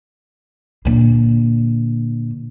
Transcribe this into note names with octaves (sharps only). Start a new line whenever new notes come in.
A#2 D3